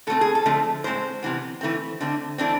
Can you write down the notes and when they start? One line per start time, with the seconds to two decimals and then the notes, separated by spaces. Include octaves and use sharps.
0.07 B2 A3 C4 A4
0.21 G#4
0.35 A4
0.46 D3 F3 A3 C4
0.84 A2 G#3 C4 C5
1.23 C3 E3 B3
1.61 E3 A3 C4
2.00 D3 A3 C4
2.38 E3 A3 C4 D4